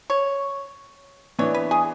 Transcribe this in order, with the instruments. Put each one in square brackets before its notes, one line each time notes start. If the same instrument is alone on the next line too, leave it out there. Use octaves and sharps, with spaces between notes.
[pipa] C#5
[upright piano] E3 B3 D4 [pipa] C#5
[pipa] B4
G#4